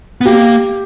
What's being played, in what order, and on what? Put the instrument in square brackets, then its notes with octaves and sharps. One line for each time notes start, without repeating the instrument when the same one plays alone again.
[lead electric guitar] B3
[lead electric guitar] A#3 [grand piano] G4